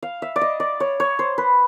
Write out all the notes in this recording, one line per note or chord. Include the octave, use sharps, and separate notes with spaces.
F5
E5
D5
D#5
D5
C#5
C#5
C5
B4